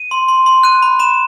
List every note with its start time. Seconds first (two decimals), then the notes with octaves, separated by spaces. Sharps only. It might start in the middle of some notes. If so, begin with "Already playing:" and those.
Already playing: D#7
0.11 C6
0.28 C6
0.46 C6
0.63 F#6 D#7
0.82 B5
1.00 B5 E7